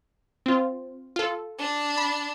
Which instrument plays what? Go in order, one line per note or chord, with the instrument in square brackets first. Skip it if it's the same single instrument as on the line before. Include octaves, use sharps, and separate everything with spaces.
[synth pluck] C4 F4
F4 A4
[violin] D4
[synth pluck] B5